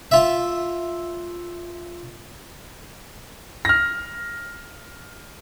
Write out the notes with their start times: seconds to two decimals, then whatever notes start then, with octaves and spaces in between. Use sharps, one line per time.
0.11 F4 E5
3.65 F6 A#6